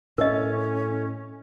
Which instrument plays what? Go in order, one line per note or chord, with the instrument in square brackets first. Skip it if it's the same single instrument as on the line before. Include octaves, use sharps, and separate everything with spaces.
[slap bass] A2 [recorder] C#4 [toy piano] A#4 D#5